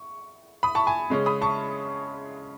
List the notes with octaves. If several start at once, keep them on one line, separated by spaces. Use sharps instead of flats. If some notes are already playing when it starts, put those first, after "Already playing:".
Already playing: C#6
B5 D#6
A5 C#6
G#5 B5
C#3 G#3 C#4
B5 D#6
A5 C#6